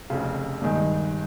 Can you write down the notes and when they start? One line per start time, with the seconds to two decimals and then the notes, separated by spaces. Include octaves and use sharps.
0.10 F1 F2 C#3
0.61 G#1 G2 D#3 G#3